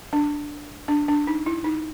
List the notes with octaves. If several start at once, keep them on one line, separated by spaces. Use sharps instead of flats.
D4
D4
D4
D#4
E4
D#4